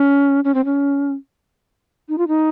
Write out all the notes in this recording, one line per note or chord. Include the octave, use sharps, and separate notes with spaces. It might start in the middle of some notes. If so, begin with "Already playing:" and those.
Already playing: C#4
C#4
C4
C#4
D#4
F4
D#4